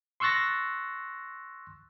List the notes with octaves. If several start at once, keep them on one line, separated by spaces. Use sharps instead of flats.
C6 C#6 E6 F#6 A6 A#6